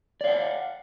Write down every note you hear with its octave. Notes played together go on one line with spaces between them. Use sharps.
D5 F5 F#5